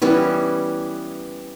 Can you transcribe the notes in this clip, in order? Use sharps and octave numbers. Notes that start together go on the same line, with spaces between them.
E3 G3 B3 C#4